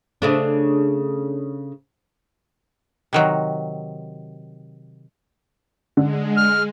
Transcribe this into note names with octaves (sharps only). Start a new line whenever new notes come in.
C#3 A3 D4
C3 D#3 F#3
D3 G#3
F6